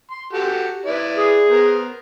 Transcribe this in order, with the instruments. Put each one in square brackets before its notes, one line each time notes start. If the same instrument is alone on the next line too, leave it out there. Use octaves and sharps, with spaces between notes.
[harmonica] C6
F#4 G4 A4
E4 B4 D5
[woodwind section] G#4
[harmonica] B3 A#4 C5